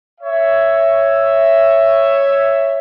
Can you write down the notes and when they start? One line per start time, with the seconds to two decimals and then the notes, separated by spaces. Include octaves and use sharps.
0.21 C#5 E5